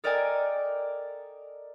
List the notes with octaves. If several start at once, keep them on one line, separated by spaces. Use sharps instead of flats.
A4 A#4 D5 D#5 G5 G#5